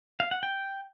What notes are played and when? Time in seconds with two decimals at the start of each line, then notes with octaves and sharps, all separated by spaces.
0.20 F5
0.31 F#5
0.43 G5